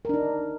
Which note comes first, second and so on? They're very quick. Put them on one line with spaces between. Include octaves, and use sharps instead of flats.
A#4 D4 D#4